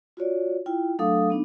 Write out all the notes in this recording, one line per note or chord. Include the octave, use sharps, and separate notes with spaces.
F4 F#4 C#5 D5
E4 F4 G5
F#3 A3 D4 A4 F5 D#6
B3 D4 D#4